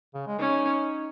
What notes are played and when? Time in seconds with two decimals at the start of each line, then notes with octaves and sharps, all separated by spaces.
0.14 C#3
0.27 G#3
0.39 C#4 D#4